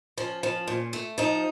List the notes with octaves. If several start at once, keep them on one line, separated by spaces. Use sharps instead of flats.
F3 C#4
F3
A#2
A3
F3 D#4